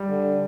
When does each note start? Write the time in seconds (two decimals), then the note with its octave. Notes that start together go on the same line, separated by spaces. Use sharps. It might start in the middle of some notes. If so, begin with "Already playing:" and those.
Already playing: G3
0.09 D3